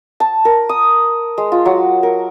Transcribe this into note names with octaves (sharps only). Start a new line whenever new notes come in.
A5
A#4
D#6
G#3
F4
F#3
A#4